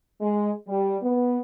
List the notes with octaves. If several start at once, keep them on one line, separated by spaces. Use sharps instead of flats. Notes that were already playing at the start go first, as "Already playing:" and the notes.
G#3
G3
B3